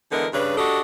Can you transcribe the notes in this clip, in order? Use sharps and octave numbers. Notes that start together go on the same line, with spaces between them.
D3 E3 G#3 B3 A#4
G2 C#3 D4 B4
D4 F#4 G4 A4 D#5